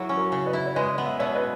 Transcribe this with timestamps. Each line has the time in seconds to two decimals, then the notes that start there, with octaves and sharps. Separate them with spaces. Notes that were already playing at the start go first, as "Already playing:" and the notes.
Already playing: F#3 E4 G#4
0.09 C#4
0.17 F#4 A#4
0.32 C#3
0.46 B4 D#5
0.53 E4
0.66 C#5
0.75 G#3 B4 D#5
0.98 B3
1.06 E5
1.19 B2 C#5 E5
1.35 B4 D#5